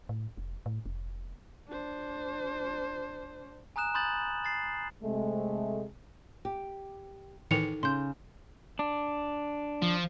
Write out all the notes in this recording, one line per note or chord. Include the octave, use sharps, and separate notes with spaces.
A2
F1
A2
F1
D4 C5
G#5 A#5 D#6 F#6 E7
B5 C6 D#6 G6 A6 F#7
A6 C7
C3 G#3 A3
G4
A2 D#3 E3 D#4 A4 C#7 F7
C#3 C6 G6
D4
F3